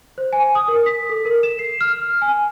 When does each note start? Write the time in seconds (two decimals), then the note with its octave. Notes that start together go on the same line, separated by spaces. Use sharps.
0.18 C5
0.33 G#5
0.55 D#6
0.68 A#4
0.86 B6
1.10 A4
1.25 A#4
1.43 E7
1.59 C7
1.81 F6
2.03 F6
2.22 G#5